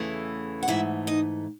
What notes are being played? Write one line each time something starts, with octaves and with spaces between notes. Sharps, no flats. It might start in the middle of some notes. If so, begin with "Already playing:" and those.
Already playing: E2 C#3 E3 A3
F#5
G#2 E3 A3 E4 E5
D#4 D#5